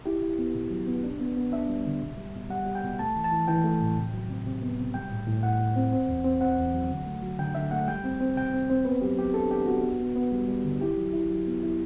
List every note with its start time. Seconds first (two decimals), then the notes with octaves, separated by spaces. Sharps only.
0.06 E4 G4
0.22 E4
0.38 B3
0.55 B2
0.71 F#3
0.87 B3
1.03 D4
1.20 B3
1.37 B3
1.52 D4 E5
1.69 G3
1.86 D3
2.01 B2
2.17 G3
2.35 B2
2.50 G3 F#5
2.66 G3
2.75 G5
2.83 B2
2.99 A3 A5
3.16 E3
3.24 A5
3.32 E3
3.48 E3 G5
3.64 A3
3.81 A2
3.97 C3
4.14 F#3
4.29 C3
4.46 C3
4.62 B3
4.79 C3
4.94 G3 G5
5.10 A2
5.27 A2
5.43 A2 F#5
5.59 A2
5.76 C4
5.92 C4
6.08 E2
6.24 C4
6.41 C4 F#5
6.58 E2
6.74 F#3
6.90 D3
7.06 A3
7.22 F#3
7.39 D3 G5
7.55 D3 E5
7.71 A3 F#5
7.88 G3 G5
8.04 C4
8.21 C4
8.36 C3 G5
8.54 C4
8.70 C4
8.85 B3 B4
9.02 F#3 G4
9.18 F#3 G4
9.34 D4 A4
9.51 D4 G4
9.66 B3 F#4
9.83 B3
10.00 B3
10.15 B3
10.32 G3
10.48 G3
10.65 D3
10.81 E4 G4
10.97 F#3
11.13 E4
11.30 F#3
11.46 B3
11.63 E4